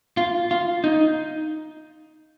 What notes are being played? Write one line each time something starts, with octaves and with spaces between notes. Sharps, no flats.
F4
F4
D#4